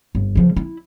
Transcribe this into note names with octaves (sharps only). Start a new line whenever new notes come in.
G1
C#3 F3
E4